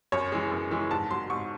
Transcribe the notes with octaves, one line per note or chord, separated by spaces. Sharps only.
F#2 C#5
E3 G#3
F#2
E3 G#3
G#2 A5
F#3 C6
G#2 C#6